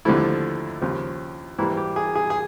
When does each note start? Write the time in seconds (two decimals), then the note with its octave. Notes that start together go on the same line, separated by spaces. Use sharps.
0.05 D#2 D3 F3 A3 E4
0.81 D#2 C#3 F3
1.58 G#2 E3 G3 A#3 E4
1.77 G4
1.96 G#4
2.15 G#4
2.30 G#4